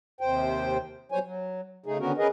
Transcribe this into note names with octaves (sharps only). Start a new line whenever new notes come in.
D#2 C3 C5 G5
B2 F#3 G3 C5 C#5 G#5
F#3
C#3 A3 D#4 G#4
D3 D#3 B3 C#4 F#4 A#4
C#4 G#4 A#4 B4 D#5